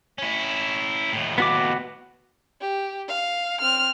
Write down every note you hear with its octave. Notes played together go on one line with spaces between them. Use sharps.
C#4 E4
D#2 A2
B3 F#4 D6
G4
F5
C4 F6